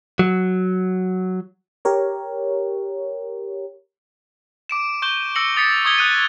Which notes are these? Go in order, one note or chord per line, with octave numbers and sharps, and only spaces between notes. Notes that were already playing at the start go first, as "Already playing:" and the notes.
F#3
G4 A#4 C#5
D6 D7 E7
C#6 G6 E7 G7
E6 A#6 C#7 F#7
D#6 A6 B6 C#7
C#6 D#6 G#6 G7
D#6 F#6 D#7